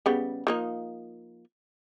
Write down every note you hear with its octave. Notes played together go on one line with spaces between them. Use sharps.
C#3 G3 B3
F3 A#3 D#4